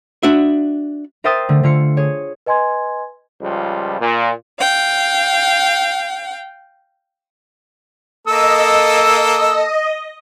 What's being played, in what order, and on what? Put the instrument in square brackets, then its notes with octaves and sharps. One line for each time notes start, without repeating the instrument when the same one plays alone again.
[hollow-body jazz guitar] D4 F#4 E5
[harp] A#4 C5 E5 G5 D#6 A6
D3 A3
D3 F4 C#7
G#4 C#5
[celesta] B4 D#5 G#5 C6 G#6
[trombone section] C#2 F3 G3
A#2
[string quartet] F5 G5
[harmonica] A#3 A4 E6 [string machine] D#5